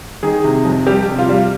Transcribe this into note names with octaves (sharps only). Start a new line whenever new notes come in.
D#3 G#4
C3
F2
G3 G4
C3
F4
G3